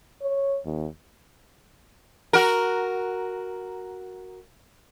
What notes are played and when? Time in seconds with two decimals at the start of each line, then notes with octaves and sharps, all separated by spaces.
0.22 C#5
0.65 D#2
2.33 F#4 A#4